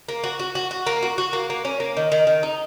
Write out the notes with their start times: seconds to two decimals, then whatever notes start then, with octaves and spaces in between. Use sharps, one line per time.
0.08 A#3
0.24 F#4
0.39 F#4
0.55 F#4
0.71 F#4
0.87 A#3
1.03 F#4
1.18 F#4
1.33 A#3
1.50 A#3
1.65 C#4
1.80 A#3
1.97 D#3
2.12 D#3
2.27 D#3
2.43 D#4